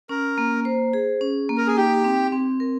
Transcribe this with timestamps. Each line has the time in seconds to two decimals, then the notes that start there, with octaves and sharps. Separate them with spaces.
0.09 C#4 A#4
0.38 A#3
0.65 C5
0.93 G#4
1.21 C#4
1.49 A#3
1.57 A#4
1.67 G#4
1.77 D#4 G4
2.04 C4
2.32 C4
2.60 A#4